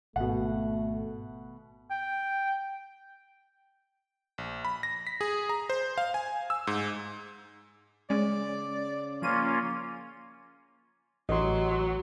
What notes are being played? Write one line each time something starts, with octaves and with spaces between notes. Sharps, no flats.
G#1 B2 A3 F#5
G5
A#1
B5
A#6
B6
G#4
A#5
C5
F5
G#5
E6
G#2
C#3 G#3 C#4 D5
F3 A#3 C#4 F4 D#7
A1 F#3 D#5 C6